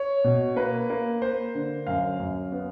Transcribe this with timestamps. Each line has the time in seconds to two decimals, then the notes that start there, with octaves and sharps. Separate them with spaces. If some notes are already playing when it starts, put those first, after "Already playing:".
Already playing: C#5
0.24 B2
0.56 A#3 B4
0.90 A#3
1.22 A#3 C5
1.55 D3
1.87 F#2 F5
2.20 F#2
2.52 B3